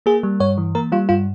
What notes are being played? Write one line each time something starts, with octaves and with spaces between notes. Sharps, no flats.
A#3 G#4
G3
G2 C#5
E3
A#3 A#4
G3 F4
G2 F4